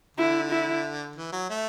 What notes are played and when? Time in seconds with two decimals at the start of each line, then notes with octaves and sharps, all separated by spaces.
0.17 D3 E4
0.50 E4
1.16 E3
1.33 F#3
1.50 A3